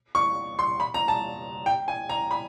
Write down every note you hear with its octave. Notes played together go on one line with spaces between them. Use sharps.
C#6
C6
B5
A#5
A5
G5
G#5
A#5
B5